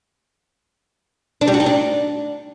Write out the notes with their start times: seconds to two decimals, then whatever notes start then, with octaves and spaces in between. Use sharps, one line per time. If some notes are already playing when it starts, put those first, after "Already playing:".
1.41 D4
1.48 G3
1.54 F#4
1.60 D#4
1.66 D4